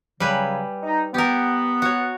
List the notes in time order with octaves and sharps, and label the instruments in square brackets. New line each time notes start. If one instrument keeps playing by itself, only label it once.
[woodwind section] C#3 F#3 [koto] G3 B4 G#5
[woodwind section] D#4
[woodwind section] B3 [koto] G4 A#4
[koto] F#4 C#5